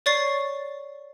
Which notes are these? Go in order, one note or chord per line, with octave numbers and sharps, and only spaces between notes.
C#5 D5 C#6 A6 C7